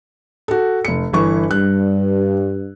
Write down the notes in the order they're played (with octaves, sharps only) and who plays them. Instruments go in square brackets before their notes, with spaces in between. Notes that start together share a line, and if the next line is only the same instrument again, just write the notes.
[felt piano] F#4 A4
F1 C#7
G1 E3 C#6
[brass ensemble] G2 [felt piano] F#6